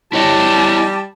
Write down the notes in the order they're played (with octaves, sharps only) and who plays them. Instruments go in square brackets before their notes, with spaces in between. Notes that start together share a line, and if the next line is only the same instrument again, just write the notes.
[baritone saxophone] G3 [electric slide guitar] E4 C#5 D#5 [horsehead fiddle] A5